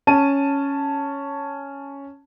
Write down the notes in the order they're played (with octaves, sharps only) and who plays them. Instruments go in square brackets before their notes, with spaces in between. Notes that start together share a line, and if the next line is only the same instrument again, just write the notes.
[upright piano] C#4 A5 D#7